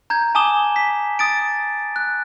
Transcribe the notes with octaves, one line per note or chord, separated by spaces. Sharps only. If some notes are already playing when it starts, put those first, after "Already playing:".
A#5 G6 G#6
G#5 A5 D6 D#6 E7 G7
B6
D#6 A6 D7
F#6